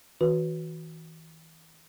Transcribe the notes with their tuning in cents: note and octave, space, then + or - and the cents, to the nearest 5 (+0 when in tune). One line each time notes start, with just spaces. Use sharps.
E3 -40 F#4 -10 B4 +0